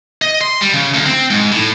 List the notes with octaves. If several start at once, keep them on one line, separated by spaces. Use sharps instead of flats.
D#5
C6
G3
C#3
D2
C4
G#2
A2